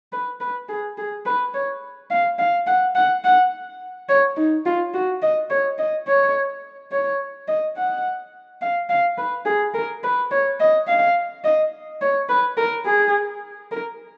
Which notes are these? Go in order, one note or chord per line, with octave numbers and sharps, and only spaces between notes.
B4
B4
G#4
G#4
B4
C#5
F5
F5
F#5
F#5
F#5
C#5
D#4
F4
F#4
D#5
C#5
D#5
C#5
C#5
D#5
F#5
F5
F5
B4
G#4
A#4
B4
C#5
D#5
F5
D#5
C#5
B4
A#4
G#4
A#4